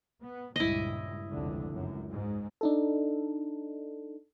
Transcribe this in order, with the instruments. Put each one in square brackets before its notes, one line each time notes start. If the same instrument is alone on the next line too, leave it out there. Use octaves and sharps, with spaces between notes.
[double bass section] B3
[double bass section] C#2 G2 A#2 [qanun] E4 D#5
[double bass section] F1 C#2 D3
C#2 F#2
G#2
[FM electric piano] D4 D#4 A4